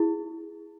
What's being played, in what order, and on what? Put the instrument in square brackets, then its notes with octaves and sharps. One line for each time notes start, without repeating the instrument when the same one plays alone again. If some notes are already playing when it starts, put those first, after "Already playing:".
Already playing: [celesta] E4 G#4